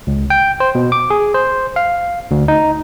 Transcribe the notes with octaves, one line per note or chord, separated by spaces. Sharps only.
C#2
G5
C5
B2
D6
G#4
C5
F5
D2
D#4